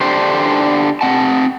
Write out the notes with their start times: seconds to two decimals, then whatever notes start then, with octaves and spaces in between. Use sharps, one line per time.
0.01 D3 D4 G4 C5
1.01 C4 F#5 A5